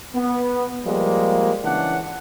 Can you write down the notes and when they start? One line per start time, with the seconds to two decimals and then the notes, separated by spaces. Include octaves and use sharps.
0.15 B3
0.86 F3 G3 G#3 A#3
1.64 C#3 E3 C#4 D4 F#5